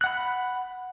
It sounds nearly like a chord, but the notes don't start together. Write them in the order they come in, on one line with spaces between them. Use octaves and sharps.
F#6 F#5 B5